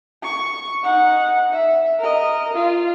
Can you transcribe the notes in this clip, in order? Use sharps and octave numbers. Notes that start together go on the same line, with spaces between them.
C#6
D#4 F#5
E5
A#4 D#5
F4